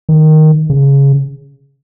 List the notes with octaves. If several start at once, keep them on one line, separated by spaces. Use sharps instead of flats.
D#3
C#3